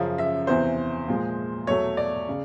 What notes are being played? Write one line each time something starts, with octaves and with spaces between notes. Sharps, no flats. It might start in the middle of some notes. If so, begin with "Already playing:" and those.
Already playing: F#2 C#3 F3
E5
E2 C3 E3 C5
A#2 F3 G#3
E2 B2 F#3 A3 C#5
D5
C#3